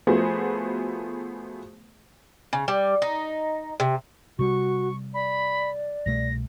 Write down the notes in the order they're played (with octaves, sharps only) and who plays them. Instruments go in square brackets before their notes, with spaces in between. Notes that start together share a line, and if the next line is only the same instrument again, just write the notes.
[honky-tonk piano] F3 A3 B3 F#4 G#4 C5
[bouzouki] C#3
G3
D#4
C3
[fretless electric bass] C3 G3 [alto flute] F#4 [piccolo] C#6
[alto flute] D5 [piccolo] B5
[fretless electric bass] C2 B2 A3 [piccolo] A#6